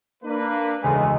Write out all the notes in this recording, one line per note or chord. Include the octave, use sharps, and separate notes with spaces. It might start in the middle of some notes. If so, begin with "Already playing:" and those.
A#3 D4 B4
E1 C#2 C#3 G#3 A3 G#5